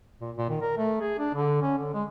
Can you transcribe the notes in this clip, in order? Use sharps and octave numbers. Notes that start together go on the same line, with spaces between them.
A#2
A#2
D#3
A#4
A3
G#4
D4
D3
C#4
D3
G#3